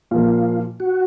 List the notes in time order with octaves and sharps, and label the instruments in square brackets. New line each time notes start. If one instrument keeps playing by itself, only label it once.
[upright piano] A#2 F3 A#3 [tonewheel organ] F4
[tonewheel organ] F#4